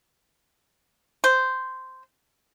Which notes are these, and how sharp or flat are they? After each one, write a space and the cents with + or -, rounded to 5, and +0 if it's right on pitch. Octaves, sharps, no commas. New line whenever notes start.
C5 -10